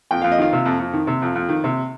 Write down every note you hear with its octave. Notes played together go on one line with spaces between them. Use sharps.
F2 G5
F2 F5
D#5
D#3 F4 F5
C3
F2
F2
D#3
C3
F2
F2
D#3
C3